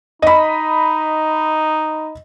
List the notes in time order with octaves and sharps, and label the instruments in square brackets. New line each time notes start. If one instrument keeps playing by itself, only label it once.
[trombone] D#4 [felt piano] D#5 B5